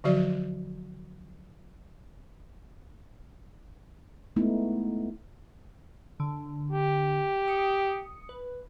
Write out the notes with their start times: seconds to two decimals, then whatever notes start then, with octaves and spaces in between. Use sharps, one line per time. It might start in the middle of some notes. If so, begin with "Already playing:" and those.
0.04 D3 F3 F#3 F#4 D5
4.36 G#3 A3 B3 D#4 E4
6.20 D3
6.71 G4
7.48 D#6 C#7
8.29 B4